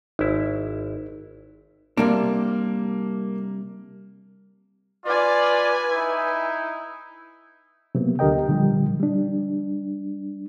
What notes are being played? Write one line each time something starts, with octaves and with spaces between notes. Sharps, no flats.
G#1 D#4 E4
C3 G3 A#3 D4
F4 B4 D5 G#5
D#4 E4
C3 F#3 A#3 B3
D2 D3 G4 A#4 D#5 G5
A#2 D3 F3 G3
G3 D4